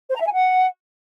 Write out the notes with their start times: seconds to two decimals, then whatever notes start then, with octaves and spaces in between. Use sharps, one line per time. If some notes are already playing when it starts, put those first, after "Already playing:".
0.09 C5
0.15 A#5
0.21 E5
0.27 G#5
0.33 F#5